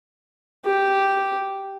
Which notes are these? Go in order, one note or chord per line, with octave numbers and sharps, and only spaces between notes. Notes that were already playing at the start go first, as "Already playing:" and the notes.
G4